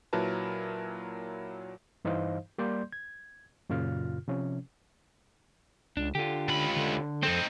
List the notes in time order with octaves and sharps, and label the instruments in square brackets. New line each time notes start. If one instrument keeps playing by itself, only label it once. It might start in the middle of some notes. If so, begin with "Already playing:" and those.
[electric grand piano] A#2 F#3 E4 A#4 B4 A5
[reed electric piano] G2 E3 D#4 C5 D#5 F5
G3 A#3 D5 C6 G6
G#6
F#2 A#2 C#3 F4 F6
C3 F3 C#4
[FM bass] C#2 [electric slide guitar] D4
[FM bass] D3 [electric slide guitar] F4 G4
[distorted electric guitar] C#2 B5
[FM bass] D3
[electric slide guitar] F2 A4 C5 [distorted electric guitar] C4 D#4